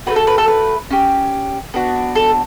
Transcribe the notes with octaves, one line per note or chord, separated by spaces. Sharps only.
A3 C#4 F#4 B4
A4
B4
A4
B4
C#4 G4
B3 D4 F#4
A4